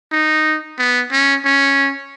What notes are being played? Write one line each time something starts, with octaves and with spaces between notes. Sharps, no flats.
D#4
B3
C#4
C#4